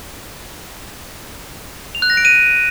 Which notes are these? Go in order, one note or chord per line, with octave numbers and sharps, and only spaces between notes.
F7
F#6
A#6
D7
D#7